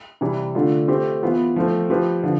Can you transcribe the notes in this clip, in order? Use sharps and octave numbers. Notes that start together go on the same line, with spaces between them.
C3 E3 G3
D3 A3 D4 F4
A3 C4 G4
E3 B3 F4
F3 A3 C4
F3 C4 G4 B4
D3 F3